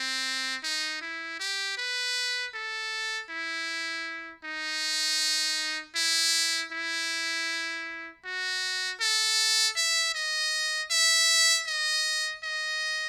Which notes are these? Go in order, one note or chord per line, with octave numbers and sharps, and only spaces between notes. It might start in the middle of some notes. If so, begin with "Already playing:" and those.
Already playing: C4
D#4
E4
G4
B4
A4
E4
D#4
E4
E4
F#4
A4
E5
D#5
E5
D#5
D#5